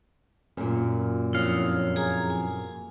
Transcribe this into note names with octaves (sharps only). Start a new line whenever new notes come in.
F#2 A#2
F2 E4 C#5 F5 D#6
G#4 G#5 A#5
G#5